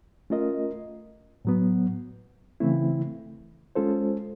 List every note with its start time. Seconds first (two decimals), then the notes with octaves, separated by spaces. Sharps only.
0.30 A3 C#4 F4 A#4 D#5
1.45 A2 F#3 B3
2.60 C#3 E3 A3 C4 E4
3.75 G#3 C#4 F4 A4 C5